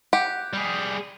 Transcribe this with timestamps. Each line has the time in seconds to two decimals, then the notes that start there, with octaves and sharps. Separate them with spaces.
0.13 G4 F#5
0.53 G3 G#4